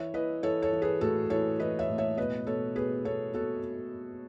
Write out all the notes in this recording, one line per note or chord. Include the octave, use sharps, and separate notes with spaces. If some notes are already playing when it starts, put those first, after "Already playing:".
Already playing: E3 C#5 E5
E3 B4 D#5
E3 A4 C#5
A4 C#5
E3
G#4 B4
A2 F#4 A4
E3 A4 C#5
E3 B4 D#5
C#5 E5
A2
C#5 E5
B2 B4 D#5
B2 A4 C#5
B2 G#4 B4
B2 A4 C#5
B2 F#4 A4